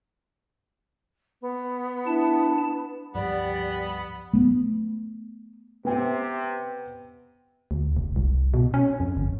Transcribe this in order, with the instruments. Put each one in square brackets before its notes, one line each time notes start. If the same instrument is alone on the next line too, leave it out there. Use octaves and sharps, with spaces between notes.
[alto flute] B3
[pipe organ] D4 A5 [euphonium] E4
[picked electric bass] C#2 G2 F3 [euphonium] G3 [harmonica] B3 F#5 B5 [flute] D5
[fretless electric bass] A3 B3
[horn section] C3 [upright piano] B3 G5
[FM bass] D2
F1
C2
B2
C#4
F2
G1